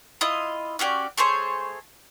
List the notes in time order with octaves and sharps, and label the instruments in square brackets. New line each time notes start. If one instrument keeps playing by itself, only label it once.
[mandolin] E4 F4 D#5
C#4 F#4 G4 D5
A3 G#4 C5 C#5